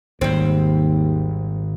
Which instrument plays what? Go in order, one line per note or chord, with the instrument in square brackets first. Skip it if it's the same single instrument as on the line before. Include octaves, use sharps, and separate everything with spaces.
[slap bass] G#1 G#2 [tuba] D#2 [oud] G3 C4